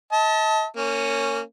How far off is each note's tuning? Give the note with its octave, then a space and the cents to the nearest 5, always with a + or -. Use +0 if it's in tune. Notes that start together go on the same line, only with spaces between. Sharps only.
D#5 +40 A5 +0
A#3 -25 C#4 +0